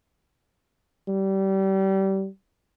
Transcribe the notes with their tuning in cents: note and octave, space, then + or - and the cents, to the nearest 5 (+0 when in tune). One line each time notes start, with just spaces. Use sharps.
G3 -25